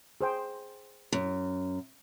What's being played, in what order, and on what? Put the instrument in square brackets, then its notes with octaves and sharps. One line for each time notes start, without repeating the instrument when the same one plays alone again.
[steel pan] G#4 C5 G5
[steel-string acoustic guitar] F#2